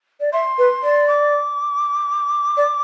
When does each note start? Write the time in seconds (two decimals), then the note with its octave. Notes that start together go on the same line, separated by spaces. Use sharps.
0.20 D5
0.33 E5 C6
0.58 B4
0.83 D5
1.08 D6
2.57 D5